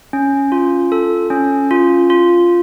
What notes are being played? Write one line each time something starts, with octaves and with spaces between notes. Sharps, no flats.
C#4
F4
A4
C#4
F4
F4